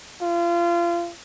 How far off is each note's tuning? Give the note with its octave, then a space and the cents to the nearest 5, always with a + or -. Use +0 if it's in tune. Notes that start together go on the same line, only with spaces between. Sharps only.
F4 -30